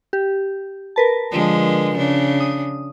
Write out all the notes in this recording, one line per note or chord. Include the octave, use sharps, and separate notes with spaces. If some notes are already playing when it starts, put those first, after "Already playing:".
G4
A#4 B4 A5
D3 F3 G#3
C#3 D4
D#6